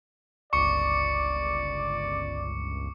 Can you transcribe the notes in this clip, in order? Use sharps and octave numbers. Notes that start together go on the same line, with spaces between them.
G1 C#2 D5 C#6 D6 C#7